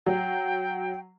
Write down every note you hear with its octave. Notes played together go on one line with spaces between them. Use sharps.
F#3 G5